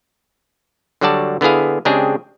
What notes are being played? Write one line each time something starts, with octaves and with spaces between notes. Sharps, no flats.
D3 F#3 G3 F#4 D5 A5
D3 B3 E4 G#4 F5
C#3 G#3 C4 D4 G4 G#4